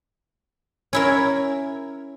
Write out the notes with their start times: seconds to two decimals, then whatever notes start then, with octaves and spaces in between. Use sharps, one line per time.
0.93 C#4 E4 A#4